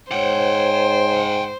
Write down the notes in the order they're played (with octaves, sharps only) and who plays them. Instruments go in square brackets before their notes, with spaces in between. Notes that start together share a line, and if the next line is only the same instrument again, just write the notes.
[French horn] G#2 [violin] C5 [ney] C#5 [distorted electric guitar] F#5 G5